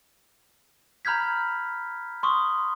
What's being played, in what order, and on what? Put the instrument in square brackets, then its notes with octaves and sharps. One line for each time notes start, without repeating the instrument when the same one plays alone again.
[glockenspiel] A#5 B5 F6 G6 G#6 B6
C6 C#6 D#6